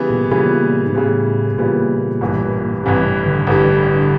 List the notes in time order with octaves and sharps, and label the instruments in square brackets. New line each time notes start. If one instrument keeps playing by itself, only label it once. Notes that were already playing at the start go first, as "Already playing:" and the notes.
Already playing: [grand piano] C#3 E3 G3 B3
[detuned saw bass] A#2
[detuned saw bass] A#2 [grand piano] C#3 E3 G3 B3
[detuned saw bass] G#2
[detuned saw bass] A2 [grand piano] C#3 E3 G3 B3
[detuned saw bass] A#2 [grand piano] C#3 E3 G3 B3
[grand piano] A1 G2 E3 G3
[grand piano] A1 G2 E3 G3 [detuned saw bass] C3
[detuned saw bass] D3
[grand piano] A1 G2 E3 G3 [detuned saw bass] D3